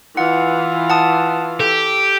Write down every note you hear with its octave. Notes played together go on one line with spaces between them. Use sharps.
E3 F4 F#5
F#5 A5 D#6
G4 A4